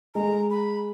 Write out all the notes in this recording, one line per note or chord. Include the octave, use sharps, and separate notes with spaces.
G#3 A#5
B5